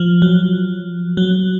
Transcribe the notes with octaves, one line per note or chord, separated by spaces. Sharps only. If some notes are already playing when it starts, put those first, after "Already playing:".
Already playing: F3
F#3
F#3